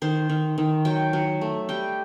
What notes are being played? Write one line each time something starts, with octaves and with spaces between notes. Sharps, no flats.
D#3 C5
D#3
D#3
F#3 G5
F#3
A3
G3 G5